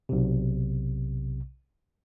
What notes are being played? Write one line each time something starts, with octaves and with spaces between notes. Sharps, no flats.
B1 C3